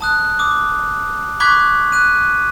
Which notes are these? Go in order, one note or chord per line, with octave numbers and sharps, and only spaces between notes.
A5 D#6 F#6
D6 D#6
B5 C#6 D6 F#6 G#6 B6
F#6 D#7